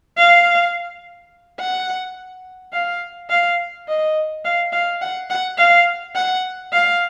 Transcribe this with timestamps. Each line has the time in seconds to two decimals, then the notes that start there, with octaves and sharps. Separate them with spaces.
0.17 F5
1.60 F#5
2.73 F5
3.30 F5
3.88 D#5
4.45 F5
4.72 F5
5.02 F#5
5.30 F#5
5.58 F5
6.15 F#5
6.73 F5